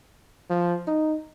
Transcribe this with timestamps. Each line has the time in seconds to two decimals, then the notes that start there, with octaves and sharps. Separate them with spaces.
0.50 F3
0.87 D#4